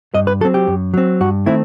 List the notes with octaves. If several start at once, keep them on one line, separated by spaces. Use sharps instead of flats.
G2 D#5
B4
F#3 C4 A4
G4
F#2
F#3 C4
G2 F#4
D#3 A3 C4 E4